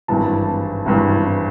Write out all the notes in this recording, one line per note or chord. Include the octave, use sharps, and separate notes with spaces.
G#1 G2 E3 A5
G#1 G2 E3